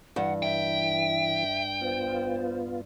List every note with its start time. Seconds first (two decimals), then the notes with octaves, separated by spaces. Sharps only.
0.16 G2 E3 F#5
0.43 E5 G5
1.81 B3 F4 C5